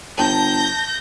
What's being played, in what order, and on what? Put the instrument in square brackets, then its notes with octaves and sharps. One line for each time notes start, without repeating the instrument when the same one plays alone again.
[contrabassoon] G1 [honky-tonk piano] A5 [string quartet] G6 A#6